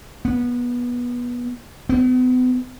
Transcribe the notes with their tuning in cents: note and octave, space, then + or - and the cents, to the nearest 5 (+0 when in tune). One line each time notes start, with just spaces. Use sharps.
B3 -20
B3 +40